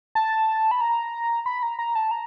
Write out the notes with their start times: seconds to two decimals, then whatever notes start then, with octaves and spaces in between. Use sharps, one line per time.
0.15 A5
0.71 B5
0.81 A#5
1.46 B5
1.63 A#5
1.79 A#5
1.95 A5
2.11 A#5